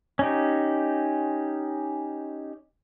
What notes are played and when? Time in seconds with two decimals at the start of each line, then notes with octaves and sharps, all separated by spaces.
0.19 C#4 D#4 G4